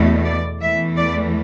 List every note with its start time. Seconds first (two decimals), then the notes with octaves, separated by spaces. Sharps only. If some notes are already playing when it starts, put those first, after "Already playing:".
Already playing: E2 B2 A3
0.25 D5
0.61 E2 E3 A3 E5
0.97 D5